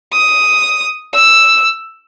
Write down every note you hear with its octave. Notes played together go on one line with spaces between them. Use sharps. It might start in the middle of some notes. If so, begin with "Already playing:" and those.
D#6
E6